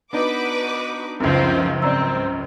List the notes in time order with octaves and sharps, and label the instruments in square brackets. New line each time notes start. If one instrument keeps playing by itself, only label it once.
[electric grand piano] B3 D4 D#4 [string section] F#4 B4 D6
[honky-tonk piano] C#2 F#2 [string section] F3 C4 F4
[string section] G#2 C4 [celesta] D5 A#5 E6